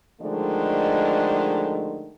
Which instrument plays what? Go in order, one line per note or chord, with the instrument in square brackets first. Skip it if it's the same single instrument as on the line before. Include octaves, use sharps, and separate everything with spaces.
[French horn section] D3 D#3 F3 G#3 A3 D4